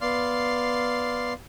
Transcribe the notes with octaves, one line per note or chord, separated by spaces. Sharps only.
B3 D5 F5 C6 F6